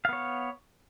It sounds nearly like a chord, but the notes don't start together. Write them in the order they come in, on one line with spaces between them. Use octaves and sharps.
F5 B3 C#5